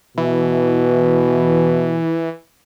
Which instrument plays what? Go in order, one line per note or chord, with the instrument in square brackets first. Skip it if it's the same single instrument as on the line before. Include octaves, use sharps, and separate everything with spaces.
[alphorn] B2 [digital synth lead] E3